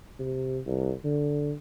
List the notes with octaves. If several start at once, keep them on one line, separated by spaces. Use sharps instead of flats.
C3
C2
D3